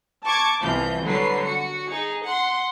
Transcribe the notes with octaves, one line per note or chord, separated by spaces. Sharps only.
A5 C#6 D6 G#6
C2 C3 E3 F3 G6
D3 F#3 G3 B4 C7
F#4 C#7
D#4 G#4
F#5 C6